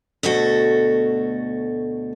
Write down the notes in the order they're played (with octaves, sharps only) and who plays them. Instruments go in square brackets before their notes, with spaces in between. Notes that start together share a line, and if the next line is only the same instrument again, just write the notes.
[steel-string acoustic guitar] D2 B2 A3 F#4 A4